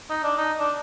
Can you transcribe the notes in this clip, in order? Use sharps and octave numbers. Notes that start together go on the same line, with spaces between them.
D#4
D4
D#4
D4